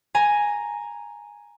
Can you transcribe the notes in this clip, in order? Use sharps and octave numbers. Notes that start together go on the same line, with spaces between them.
G#5 A#5